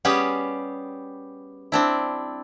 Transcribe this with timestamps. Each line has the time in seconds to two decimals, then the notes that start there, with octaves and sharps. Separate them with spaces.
0.05 G3 B3 C#4 G4 G#4
1.72 C4 D4 E4